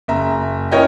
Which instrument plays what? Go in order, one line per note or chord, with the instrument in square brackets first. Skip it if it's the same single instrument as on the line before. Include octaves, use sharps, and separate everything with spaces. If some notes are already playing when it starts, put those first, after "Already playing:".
[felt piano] F#1 E5 A#5
C#4 E4 A#4 C#5 D#5 G5